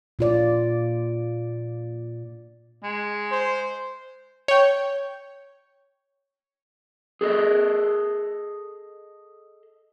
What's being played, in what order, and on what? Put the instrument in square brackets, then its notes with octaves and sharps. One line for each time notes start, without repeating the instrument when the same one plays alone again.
[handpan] A#2 F4 D5
[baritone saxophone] G#3
[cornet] C5
[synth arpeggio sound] C#5 G5
[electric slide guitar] G#4 A4 D#5